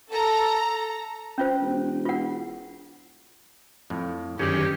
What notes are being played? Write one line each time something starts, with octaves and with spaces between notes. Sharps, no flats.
A4 A#5
C#4 F4 C5
E1
F4 F#5
F2 A2
G1 F#2 D#3 C#4 G4 G#4 D5